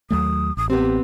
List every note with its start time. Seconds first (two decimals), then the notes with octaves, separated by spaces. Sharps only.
0.11 D#2 F#3 A3 D#6
0.57 A1 D#6
0.70 B3 C4 G4